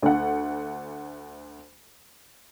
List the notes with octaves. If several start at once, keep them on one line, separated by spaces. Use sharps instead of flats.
D2 F#5